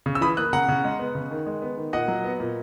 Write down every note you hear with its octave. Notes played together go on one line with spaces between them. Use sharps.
C#3
E6
E3 B5 D#6
A#3 D#6 F#6
C#3 F#5 A#5
C#3
G#3
B3
C#3
D#3
G#3
B3
D#3
A#2 D#5 F#5
F#3
B3
A#2